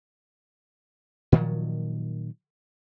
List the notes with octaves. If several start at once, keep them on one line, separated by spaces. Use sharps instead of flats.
A#2 D#3 F3 F#3